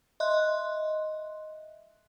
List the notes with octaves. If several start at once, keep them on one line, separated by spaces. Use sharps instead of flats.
D#5 E5 C6 F#6